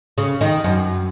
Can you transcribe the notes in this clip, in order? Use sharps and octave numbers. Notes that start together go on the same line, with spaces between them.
C#3
D#3
F#2